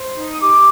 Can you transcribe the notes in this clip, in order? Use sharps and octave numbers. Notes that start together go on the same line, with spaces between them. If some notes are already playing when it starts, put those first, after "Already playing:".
Already playing: C5
D#4
D#6
G4 D6